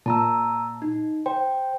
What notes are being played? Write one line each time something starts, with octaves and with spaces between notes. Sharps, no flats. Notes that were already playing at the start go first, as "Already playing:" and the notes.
A#2 A5 A#5 E6
D#4
C5 G5